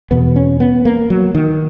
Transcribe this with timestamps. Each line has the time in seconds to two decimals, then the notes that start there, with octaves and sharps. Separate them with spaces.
0.11 E2 B2 B3
0.36 C#4
0.60 B3
0.85 A#3
1.10 F#3
1.35 D#3